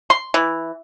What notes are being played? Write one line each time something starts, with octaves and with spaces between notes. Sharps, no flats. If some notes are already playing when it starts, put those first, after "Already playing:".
C6
E3